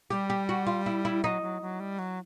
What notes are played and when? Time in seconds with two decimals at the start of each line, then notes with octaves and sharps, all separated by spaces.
0.10 G3 G4
0.30 G4
0.49 F#4
0.67 F4
0.86 E4
1.05 E4
1.24 F#3 D#4
1.42 F#3
1.62 F#3
1.80 G3
1.99 F#3